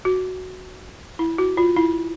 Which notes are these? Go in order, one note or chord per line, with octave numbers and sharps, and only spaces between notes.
F#4
E4
F#4
F4
E4